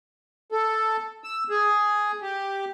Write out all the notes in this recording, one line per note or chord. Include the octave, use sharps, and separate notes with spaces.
A4
E6
G#4
G4